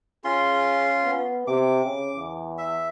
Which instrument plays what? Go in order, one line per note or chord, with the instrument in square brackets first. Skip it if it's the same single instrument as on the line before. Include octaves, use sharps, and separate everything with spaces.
[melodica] C#4 F4 C6 [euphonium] G#4
[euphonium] B3
[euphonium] C3 [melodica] D6
[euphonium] C#3
E2
[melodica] E5